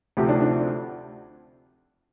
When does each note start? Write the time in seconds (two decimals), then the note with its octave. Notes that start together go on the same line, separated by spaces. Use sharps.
0.17 D2 C3 F3 A3 G4
0.29 D4
0.41 D4